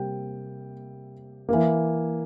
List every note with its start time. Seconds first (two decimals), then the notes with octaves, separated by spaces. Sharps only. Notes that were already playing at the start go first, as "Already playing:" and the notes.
Already playing: C3 G3 A#3 G5
1.49 E3 A#3